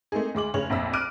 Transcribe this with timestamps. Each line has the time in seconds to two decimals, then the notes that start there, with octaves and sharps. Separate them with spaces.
0.12 A3 A#3 C4 D#4 G#4
0.35 D2 G#3 D6 F#7
0.54 F1 C#3 C#5 F#7
0.70 A#1 F2 E5 E6
0.93 D6 F6 F#6 D7 D#7